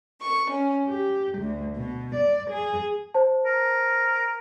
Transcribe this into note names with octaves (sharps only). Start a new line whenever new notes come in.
C#6
C#4
G4
D2
B2
D5
G#4
C5 A5
A#4